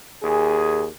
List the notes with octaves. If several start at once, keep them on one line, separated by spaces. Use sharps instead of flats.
D#2 G#4